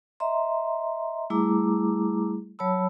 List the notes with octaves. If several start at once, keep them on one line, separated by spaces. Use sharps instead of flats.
D#5 E5 A#5 C6
G3 A3 E4 G#4 A#5 D6
F#3 C#5 A5 B5 E6